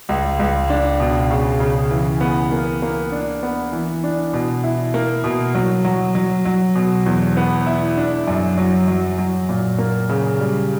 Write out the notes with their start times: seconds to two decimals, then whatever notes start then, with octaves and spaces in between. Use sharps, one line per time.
0.09 C#2
0.40 C#2
0.70 D4
1.00 B2
1.31 C#3
1.60 C#3
1.91 E3
2.21 B3
2.52 A#3
2.82 A#3
3.12 D4
3.43 B3
3.72 E3
4.03 D4
4.33 B2
4.64 E4
4.94 A#3
5.24 B2
5.55 F#3
5.85 F#3
6.15 F#3
6.45 F#3
6.75 B2
7.06 E2
7.37 B3
7.67 E4
7.97 D4
8.28 F#2
8.58 F#3
8.88 F#3
9.18 F#3
9.49 A#2
9.78 A#3
10.09 C#3
10.39 G3